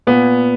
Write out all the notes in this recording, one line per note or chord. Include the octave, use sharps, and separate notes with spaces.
A#2 B3